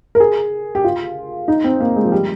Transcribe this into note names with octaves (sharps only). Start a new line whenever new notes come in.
A#4
G#4
G4
F4
D#4
C4
A#3
G#3
F3
G3